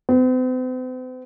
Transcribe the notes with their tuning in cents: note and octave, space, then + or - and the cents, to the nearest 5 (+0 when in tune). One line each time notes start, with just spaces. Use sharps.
C4 -45